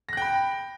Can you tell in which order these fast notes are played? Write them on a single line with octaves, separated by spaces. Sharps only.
A#6 F#6 G5 B5